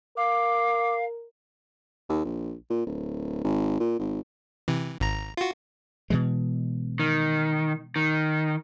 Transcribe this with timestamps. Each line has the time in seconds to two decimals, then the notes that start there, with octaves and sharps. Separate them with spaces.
0.17 A#4 F5 D6
2.09 D#2
2.25 A#1
2.70 A#2
2.86 D1
3.44 G#1
3.80 A#2
3.99 G#1
4.68 C3 E3
5.00 G#1 A#5
5.37 F4 F#4
6.10 B2 E3 G#3
7.00 D#3
7.96 D#3